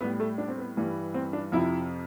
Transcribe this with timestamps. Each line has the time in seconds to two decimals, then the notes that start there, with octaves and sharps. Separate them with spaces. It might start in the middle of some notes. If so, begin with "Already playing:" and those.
0.01 A2 G3 B3
0.20 A3
0.38 D4
0.48 C4
0.58 B3
0.77 G2 E3 G3
1.14 C4
1.33 D4
1.52 F2 C3 F3 E4